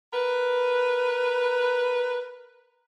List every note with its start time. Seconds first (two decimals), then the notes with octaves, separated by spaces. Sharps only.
0.13 A#4 B4